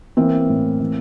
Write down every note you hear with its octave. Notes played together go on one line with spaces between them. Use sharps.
E3 A#3 C4
A2
E3